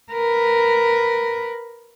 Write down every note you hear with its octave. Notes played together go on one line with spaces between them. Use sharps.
A#4 B4